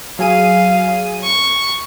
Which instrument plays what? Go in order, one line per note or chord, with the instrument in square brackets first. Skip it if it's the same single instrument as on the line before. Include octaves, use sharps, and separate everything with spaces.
[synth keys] F#3 G#4 D#7 [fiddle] F5
[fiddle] C#6